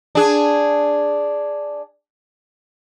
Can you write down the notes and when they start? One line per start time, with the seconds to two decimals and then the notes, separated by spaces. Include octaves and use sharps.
0.15 D4 G#4